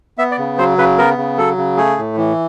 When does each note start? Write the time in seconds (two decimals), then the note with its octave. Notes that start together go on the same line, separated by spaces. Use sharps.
0.18 B3 E5
0.31 D5
0.38 C#3
0.58 F#3 C5
0.78 C#3 B4
0.98 B3 A#4
1.18 C#3
1.38 F#3 A4
1.57 C#3
1.77 A3 G#4
1.98 A2
2.18 E3